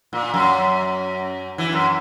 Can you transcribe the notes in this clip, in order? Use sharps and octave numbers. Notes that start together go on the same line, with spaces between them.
A#2
F#2
E3
F#2